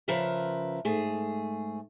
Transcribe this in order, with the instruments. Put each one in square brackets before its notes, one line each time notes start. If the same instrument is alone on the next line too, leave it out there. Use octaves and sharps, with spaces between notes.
[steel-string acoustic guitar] C#3 F3 A#4 B4 E5
G#2 A3 G#4